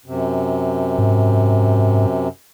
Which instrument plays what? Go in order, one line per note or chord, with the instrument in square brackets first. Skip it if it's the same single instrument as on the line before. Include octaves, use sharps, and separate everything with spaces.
[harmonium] F#2 C3
[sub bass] G#2